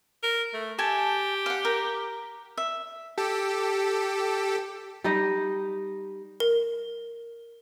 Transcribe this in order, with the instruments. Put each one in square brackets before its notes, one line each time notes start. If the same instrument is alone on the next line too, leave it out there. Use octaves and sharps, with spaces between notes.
[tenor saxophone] A#4
A3
[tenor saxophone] G4 [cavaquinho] A4 G#5 A5
[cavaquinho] F5 F#5
A#4
E5
[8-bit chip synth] G4 A4
[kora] G3 D#4 G4 D#5
[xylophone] A#4